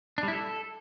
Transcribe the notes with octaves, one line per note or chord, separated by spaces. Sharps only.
D4
G3
E4
A4